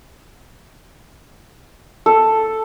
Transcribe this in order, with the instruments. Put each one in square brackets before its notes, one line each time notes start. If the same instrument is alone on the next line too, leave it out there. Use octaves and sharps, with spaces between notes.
[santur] A4